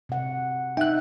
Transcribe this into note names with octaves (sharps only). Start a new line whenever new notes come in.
C3 F#5
D#4 E5 G5 F#6